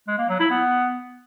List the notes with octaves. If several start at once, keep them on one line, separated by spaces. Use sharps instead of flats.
G#3
A#3
F#3
E4
B3